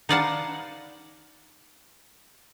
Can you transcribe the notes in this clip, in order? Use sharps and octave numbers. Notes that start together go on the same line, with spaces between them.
D#4 B4 D5 F5 F#5 A5